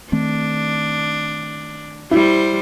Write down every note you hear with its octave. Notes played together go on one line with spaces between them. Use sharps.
D#3 A3 C4 D4
G3 E4 C5